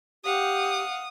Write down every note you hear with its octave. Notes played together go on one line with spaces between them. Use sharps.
G4 F5 F#5 D#6